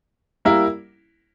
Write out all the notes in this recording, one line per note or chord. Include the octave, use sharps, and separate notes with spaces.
G3 A#3 E4 A#4